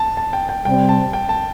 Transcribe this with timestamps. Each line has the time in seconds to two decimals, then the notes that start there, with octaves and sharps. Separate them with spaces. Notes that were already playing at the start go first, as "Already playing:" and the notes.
Already playing: A5
0.17 A5
0.33 G5
0.49 G5
0.65 C3 G3 C4 G5
0.89 A5
1.13 G5
1.29 A5